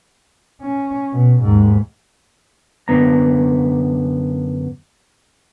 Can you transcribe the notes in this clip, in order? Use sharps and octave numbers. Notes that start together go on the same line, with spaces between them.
C#4
B2
D#2 G#2
F#2 D3 B3 A#5